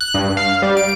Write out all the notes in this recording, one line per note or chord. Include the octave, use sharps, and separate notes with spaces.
F#6
G2
F5
G3
D7